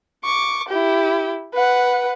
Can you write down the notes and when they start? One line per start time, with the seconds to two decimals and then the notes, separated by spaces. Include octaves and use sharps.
0.25 C#6 D6
0.69 E4 G4
1.54 B4 F#5